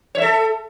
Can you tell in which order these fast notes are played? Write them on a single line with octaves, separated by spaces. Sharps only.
C#5 E5 A4